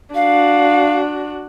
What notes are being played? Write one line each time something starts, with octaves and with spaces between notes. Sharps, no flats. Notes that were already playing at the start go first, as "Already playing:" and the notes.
D4 F#4 F5